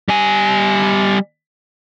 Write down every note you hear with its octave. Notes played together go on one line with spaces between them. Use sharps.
G3 G#5